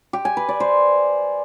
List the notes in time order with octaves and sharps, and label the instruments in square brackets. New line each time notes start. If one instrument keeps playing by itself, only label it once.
[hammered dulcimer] G4
G#5
B4
D5
C5